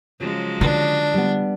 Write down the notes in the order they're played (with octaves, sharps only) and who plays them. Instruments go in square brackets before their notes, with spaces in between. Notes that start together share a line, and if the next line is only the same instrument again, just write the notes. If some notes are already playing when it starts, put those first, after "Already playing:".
[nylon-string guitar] C#3 [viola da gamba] F3 F#3 G#3
[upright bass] D3 [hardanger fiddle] D4
[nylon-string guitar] G3 B3